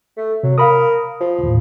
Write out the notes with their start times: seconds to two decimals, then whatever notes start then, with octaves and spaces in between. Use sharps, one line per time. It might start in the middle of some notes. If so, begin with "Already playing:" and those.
0.17 A3
0.43 C3 F#3
0.58 A#4 F5 B5 D#6
1.20 F3
1.43 D#2 A2